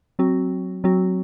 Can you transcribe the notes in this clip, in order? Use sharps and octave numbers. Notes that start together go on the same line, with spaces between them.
F#3 C4 F#4
F#3 C4 F#4